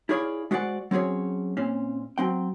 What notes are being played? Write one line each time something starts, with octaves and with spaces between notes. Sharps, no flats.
E4 F4 G#4 C#5 D5 F5
G#3 F#4 C5 D5 F#5
F#3 C4 C#4 G#4 C#5
A#2 C4 C#4
F#3 C4 G5